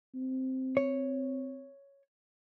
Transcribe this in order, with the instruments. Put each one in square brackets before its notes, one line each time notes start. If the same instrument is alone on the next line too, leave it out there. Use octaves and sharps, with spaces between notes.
[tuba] C4
[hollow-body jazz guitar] C#5